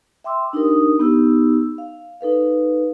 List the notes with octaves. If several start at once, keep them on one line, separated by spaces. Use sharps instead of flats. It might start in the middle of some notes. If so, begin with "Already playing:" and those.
E5 G5 C6 D6 E6
D4 D#4 G4 A#4 D#6
B3 D#4 G4 E6
F5
D#4 A4 B4 F5